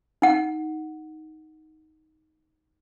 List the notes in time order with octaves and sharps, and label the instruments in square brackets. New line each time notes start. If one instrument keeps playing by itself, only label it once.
[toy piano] D#4 F#5